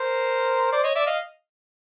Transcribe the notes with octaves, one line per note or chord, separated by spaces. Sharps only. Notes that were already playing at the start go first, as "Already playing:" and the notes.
Already playing: A#4 C5
C5 D5
C#5 D#5
D5 E5
D#5 F5